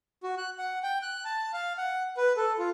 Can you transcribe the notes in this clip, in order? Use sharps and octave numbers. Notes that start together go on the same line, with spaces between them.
F#4
F#6
F#5
G5
F#6
A5
F5
F#5
B4
A4
F4